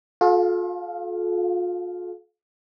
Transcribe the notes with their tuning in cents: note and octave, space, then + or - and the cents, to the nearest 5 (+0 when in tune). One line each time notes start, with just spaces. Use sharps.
F4 +40 A4 -35 F5 +0